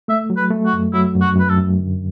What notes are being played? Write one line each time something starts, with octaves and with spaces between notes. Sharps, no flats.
A3 E5
F#3
B4
A3
F#4
F#2
F#3 E4
F#2
F#4
F#2 B4
A4
F#2
D3